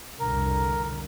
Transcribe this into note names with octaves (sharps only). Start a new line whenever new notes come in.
C2 F2 D3 A#4